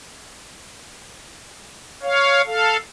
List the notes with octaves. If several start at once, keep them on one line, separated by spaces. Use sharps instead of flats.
C#5 F5
A4 F5